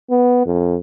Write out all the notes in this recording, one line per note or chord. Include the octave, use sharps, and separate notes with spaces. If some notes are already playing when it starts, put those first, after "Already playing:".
B3
F2